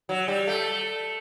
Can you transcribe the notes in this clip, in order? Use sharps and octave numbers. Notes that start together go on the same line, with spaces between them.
F#3
G3
A3